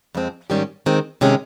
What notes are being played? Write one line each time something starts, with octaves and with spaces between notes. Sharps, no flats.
F2 C#3 G#3 C4
G#2 D#3 G3 C#4 G4
D#3 G#3 C4
C3 D#3 G#3 C#4 G4